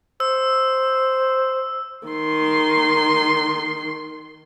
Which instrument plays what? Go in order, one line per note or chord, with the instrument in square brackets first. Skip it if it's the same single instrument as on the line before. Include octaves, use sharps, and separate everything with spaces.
[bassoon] C5 [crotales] E6
[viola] D#3 C6